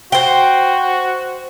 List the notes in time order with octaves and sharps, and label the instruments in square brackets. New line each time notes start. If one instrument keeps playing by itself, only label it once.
[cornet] F#4 [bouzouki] C5 G5